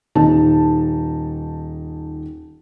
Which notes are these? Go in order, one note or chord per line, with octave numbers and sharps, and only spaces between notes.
D#1 D#4 A5